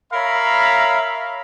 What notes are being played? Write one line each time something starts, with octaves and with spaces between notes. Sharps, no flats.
A#4 C#5 E5 F5 A#5 B5